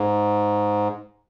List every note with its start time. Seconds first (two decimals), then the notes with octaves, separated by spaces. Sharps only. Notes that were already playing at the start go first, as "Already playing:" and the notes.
Already playing: G#2